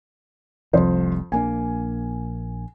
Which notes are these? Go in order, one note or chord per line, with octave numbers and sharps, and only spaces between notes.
F1 C2 F2 C5
A#1 A#3 D4 G#5